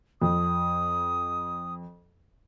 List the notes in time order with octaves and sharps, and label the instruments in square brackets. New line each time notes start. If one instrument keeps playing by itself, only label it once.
[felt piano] F2 [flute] D#6